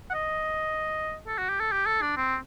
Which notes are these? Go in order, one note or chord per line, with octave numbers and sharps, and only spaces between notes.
F#5
D#5
A4
F#4
G4
A4
G4
A4
D4
C4